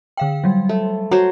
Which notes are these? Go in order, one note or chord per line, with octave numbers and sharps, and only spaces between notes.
D3 F5 G5
F#3 G3
A3
F#3 C5